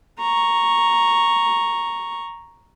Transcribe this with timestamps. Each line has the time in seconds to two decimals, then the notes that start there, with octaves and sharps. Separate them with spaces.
0.20 A#5 C#6